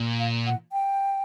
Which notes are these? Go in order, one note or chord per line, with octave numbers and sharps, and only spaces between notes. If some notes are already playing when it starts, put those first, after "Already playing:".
Already playing: A#2
F5
F#5
G5